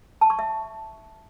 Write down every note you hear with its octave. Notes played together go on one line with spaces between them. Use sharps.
A5
C#6
E5